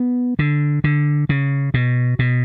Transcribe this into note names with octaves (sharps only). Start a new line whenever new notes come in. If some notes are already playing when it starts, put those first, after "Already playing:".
Already playing: B3
D3
D3
C#3
B2
B2